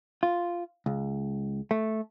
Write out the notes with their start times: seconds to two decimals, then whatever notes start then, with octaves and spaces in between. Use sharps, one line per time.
0.23 F4
0.86 C#2
1.71 A3